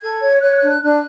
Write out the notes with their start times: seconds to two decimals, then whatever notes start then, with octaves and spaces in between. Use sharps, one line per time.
0.02 A4 G#6
0.22 C#5
0.42 C#5 F#6
0.56 F#6
0.62 D4
0.69 F#6
0.82 D4 F#6